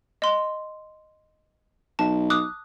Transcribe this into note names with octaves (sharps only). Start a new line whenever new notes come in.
D#5 C6
B1 A5
D6 D#6 F#6